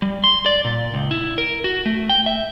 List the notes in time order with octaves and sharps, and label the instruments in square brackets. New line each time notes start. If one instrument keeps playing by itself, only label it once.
[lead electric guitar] G3
C6
D5
A#2
C#2
E4
A#4
F#4
A3
G5
E5